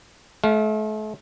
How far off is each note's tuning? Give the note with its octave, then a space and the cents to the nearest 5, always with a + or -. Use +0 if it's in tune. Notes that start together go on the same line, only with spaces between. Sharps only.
A3 -40 F5 +0